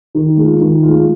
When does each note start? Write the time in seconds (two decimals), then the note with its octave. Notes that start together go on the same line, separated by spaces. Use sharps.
0.15 D#3
0.37 G#3 F4
0.60 D#3
0.83 F4
0.88 G#3